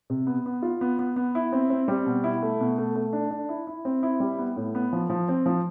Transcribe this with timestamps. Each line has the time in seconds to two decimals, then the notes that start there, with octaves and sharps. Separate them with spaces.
0.10 C3
0.27 B3
0.46 B3
0.62 F4
0.81 B3
0.99 B3
1.16 B3
1.35 E4
1.53 C4
1.70 C4
1.88 G3
2.06 B2
2.24 E4
2.42 A3
2.60 B2
2.78 A3
2.95 A3
3.13 D4
3.31 D4
3.49 E4
3.67 E4
3.85 C4
4.03 E4
4.20 G3
4.39 B3
4.56 A2
4.75 B3
4.93 F3
5.10 F3
5.29 C4
5.46 F3